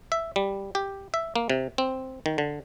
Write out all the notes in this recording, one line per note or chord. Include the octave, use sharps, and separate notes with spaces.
E5
G3
G4
E5
A#3
C3
C4
D#3
D3